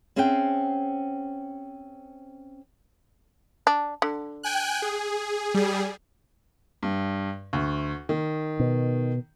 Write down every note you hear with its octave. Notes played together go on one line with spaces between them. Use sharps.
C4 C#4 G#4 E5 F#5 G5
D4
D3
G5 G#5 F#6
G#4
G3 G#4
G2
D2
D#3
B2